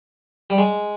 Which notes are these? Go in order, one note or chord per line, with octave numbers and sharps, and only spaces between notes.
G3
G#3